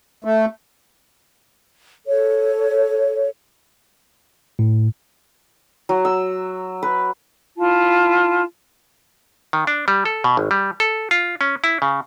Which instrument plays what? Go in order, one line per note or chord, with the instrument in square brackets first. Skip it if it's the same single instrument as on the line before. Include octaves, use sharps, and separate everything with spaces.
[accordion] A3
[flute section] A4 C#5
[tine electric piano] A2
[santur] F#3
E6
B4
[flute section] E4 F4 A5
[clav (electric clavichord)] D#3
D4
G3
A4
B2
G#1
G3
A4
F4
C#4
E4
C#3